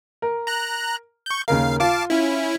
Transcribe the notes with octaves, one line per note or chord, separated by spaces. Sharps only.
A#4
A#5 F#6
C#6 G6
D#2 C#3 A#4 F5
F4 F5 A5 D6
C#4 E4